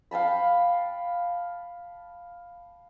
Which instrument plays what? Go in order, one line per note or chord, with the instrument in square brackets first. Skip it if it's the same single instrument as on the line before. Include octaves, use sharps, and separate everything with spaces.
[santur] F5 G5 A5 B5